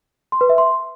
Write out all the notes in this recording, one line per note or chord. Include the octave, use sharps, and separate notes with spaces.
C6
B4
E5
C6